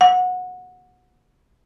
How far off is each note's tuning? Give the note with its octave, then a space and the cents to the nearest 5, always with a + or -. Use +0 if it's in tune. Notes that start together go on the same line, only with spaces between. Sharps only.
F#5 -20